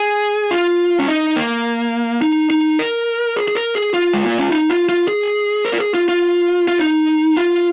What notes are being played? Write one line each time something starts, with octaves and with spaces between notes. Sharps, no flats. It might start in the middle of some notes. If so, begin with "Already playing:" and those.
Already playing: G#4
F4
C#4
D#4
A#3
D#4
D#4
A#4
G#4
G#4
A#4
G#4
F4
G#3
A#3
C#4
D#4
F4
F4
G#4
A#4
F4
G#4
F4
F4
F4
D#4
F4